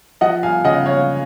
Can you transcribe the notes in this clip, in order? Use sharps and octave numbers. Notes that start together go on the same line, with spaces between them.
F3 D#5 F#5
F5 G#5
C#3 D#5 F#5
C#5 F5